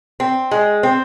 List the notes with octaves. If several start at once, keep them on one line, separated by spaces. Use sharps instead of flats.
C4
G#3
C4